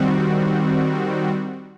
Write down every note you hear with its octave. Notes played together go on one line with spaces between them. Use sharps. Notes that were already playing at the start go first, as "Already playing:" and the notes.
Already playing: D#3 G3 C4 F#4